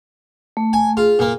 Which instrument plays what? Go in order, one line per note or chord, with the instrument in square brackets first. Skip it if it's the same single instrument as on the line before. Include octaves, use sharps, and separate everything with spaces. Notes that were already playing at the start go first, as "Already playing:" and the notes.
[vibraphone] A3
[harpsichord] G#5
[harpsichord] F4 [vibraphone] G#4
[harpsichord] A#2 A#3